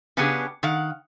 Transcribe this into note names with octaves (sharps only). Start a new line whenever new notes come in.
C#3 B3 C#4 D4 G4 G#4
D#3 F5 F#5